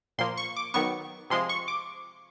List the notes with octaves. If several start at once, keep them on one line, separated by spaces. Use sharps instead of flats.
A#2 F3 A#3 C6
C#6
D6
D#3 F#3 B3 C#6
C3 F3 G#3 C6
C#6
D6